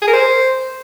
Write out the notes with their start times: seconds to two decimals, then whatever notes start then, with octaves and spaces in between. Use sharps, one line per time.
0.02 G#4
0.08 A#4
0.13 C5